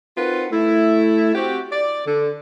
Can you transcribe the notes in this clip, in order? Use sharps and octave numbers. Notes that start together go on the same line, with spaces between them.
C4 D#4 F4 F#4 A#4 B4
A3 E4
C4 F#4 G4
D5
D3